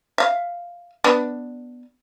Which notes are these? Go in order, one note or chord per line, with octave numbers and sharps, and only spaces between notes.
E5 F5
B3 D4